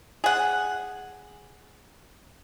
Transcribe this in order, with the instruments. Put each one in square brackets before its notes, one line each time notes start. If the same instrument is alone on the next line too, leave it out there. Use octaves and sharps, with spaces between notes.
[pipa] G#4 F#5